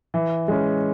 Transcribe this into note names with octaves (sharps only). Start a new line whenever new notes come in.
E3
G#3 C#4